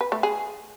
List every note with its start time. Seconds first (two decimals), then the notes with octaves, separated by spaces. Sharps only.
0.01 B4
0.12 A3
0.23 G#4